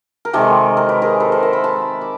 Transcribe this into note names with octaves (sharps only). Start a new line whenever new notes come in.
A#4
C3 D#3 G#3 G4 A4
A#4
B4
G#4 A#4
A4 B4
A#4 C5
E5 F#5
A5 B5
A5 B5
D6